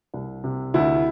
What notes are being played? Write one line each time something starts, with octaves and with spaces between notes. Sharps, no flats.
C2
C3
D2 E4